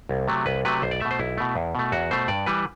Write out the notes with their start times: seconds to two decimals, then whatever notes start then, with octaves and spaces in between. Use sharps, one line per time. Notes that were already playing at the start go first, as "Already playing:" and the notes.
0.09 C2
0.28 C3 F#3 A3
0.46 C2 B4
0.65 C3 F#3 A3 B4
0.82 B1 C5
0.91 D5
1.00 B2 A3 E5
1.11 C5
1.19 B1 E4
1.38 B2 A3
1.56 E2
1.75 B2 A3
1.92 E2 F#4
2.11 B2 A3 C5
2.28 G2 D5
2.46 E3 G3 B4